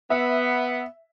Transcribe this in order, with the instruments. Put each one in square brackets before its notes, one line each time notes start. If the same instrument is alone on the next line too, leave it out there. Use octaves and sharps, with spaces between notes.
[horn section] B3 [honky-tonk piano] E5